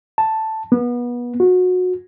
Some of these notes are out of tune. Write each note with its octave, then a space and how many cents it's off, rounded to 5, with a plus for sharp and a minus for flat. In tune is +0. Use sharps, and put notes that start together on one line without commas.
A5 +0
B3 -30
F#4 -25